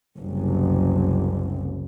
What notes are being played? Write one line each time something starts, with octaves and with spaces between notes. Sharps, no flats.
F#1 C2